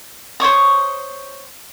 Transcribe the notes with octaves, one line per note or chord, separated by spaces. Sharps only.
C5 C#5 C#6 D#6